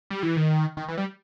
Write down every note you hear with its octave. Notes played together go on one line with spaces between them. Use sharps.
G3
E3
D#3
D#3
E3
G3